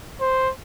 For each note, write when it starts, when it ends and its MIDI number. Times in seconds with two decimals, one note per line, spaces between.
0.21 0.50 72